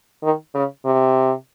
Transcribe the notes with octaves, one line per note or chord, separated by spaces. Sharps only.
D#3
C#3
C3